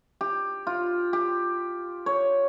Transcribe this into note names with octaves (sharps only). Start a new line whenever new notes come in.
G4
F4
G4
C#5